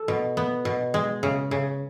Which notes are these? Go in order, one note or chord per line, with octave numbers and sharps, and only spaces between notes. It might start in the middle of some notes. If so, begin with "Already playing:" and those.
Already playing: A4
B2
B3
B2
G#3
C#3
C#3